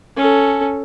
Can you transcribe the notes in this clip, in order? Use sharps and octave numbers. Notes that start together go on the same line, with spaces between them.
C#4 A4